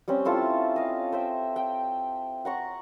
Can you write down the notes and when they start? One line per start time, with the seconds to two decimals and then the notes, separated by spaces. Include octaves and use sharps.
0.08 G3 C4 C#4
0.25 E4 F4 A4 A5
0.76 D#5 F5
1.13 C5 E5 G5
1.56 G5
2.45 F#5 A#5 C#6